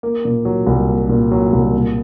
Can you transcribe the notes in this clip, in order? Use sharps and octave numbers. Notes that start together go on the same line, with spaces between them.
A#3
A#2
F#3
C2
A#3
A#2
F#3
C2
A#2